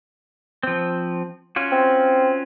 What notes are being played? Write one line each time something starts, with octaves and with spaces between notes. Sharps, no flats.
F3 C4
C#4 F4 F#4
C4